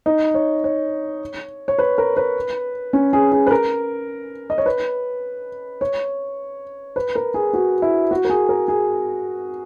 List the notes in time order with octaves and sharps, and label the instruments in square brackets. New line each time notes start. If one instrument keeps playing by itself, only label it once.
[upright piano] D#4
C#5
C#5
C#5
B4
A#4
B4
C#4
G#4
G#4
B4
A#4
D#5
C#5
B4
C#5
B4
A#4
G#4
F#4
E4
F#4
A#4
G#4
A#4
G#4